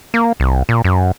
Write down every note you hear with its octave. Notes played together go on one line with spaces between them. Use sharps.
A#3
C2
A#2
F#2